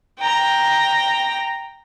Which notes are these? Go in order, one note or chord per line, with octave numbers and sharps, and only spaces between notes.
G5 A#5